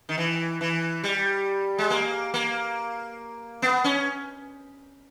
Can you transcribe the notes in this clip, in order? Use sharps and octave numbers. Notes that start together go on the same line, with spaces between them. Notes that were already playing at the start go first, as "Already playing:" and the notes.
D#3
E3
E3
G3
G#3
A#3
A#3
B3
C#4